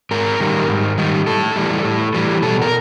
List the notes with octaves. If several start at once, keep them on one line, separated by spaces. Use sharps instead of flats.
G#2 A#4
D#3 G3
G#2
D#3 G3
A2 A4
E3 G3
A2
E3 G3
B2 A4
A#4